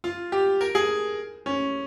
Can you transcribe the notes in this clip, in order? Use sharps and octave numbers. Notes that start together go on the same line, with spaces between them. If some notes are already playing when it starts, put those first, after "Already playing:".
F4
G4
A#4
G#4
C#4